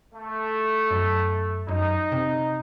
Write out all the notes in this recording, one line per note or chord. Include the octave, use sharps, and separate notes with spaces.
A3
F#2
F#2 D#4
C3